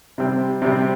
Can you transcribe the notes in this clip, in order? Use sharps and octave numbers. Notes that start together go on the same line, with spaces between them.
C3 G3 C4
C3 G3 C4